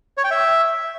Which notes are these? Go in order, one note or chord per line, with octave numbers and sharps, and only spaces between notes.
C#5
G5
E5